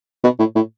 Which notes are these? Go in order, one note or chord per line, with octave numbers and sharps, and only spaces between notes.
B2
A2
A2